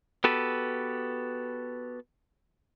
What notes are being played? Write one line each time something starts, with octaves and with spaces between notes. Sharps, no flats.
B3 F#4 G4 A4 B4